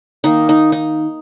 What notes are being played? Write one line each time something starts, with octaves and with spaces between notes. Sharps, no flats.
D#3 A#3 D#4
D#4
D#4